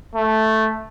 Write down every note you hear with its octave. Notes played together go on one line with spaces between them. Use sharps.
A3